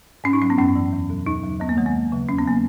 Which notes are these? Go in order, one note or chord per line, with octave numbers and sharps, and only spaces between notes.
G#2 C#4
D#4
F#3 C#4
B3
F#2 C#4
E3
E2
B2 F#3
D#2 D#4
C#3 F#3
D#2 B3
A#3
D#3 F#3 G#3
A#3
D#2
C#3 F#3
E2 C#4
B3
C#3 F#3 A#3